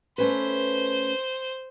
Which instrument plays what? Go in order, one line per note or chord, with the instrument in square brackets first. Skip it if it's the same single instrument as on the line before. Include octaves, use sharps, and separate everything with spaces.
[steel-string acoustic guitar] A3 C#4 B4 [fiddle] C5